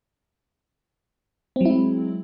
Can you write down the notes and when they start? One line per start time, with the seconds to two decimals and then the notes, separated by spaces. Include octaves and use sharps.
1.56 C4
1.61 F#3
1.65 E4
1.70 G#3